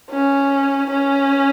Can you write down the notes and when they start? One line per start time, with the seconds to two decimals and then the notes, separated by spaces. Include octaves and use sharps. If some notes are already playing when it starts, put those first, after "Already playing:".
0.10 C#4
0.90 C#4